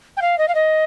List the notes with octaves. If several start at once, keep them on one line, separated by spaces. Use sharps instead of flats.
G5
F5
D#5
F5
D#5